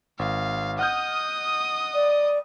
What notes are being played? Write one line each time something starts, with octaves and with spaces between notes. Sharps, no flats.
G#1 F5
D#5 F#5 D#6 F6 G6
D5